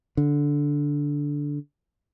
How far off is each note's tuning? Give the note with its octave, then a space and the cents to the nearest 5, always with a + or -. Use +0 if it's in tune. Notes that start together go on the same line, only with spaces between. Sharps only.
D3 -10